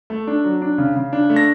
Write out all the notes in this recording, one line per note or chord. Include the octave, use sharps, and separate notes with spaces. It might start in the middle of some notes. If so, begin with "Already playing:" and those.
A3
D4
F#3
D4
C#3
C#3
D4
A3
A#6